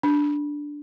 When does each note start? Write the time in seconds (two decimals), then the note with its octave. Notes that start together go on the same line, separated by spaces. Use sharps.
0.03 D4